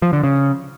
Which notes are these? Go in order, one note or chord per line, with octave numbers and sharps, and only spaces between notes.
F3
D3
C#3